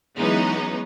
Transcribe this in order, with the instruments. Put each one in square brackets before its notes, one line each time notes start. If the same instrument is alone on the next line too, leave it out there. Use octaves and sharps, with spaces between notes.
[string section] E3 F#3 G#3 B3 C#4 D#4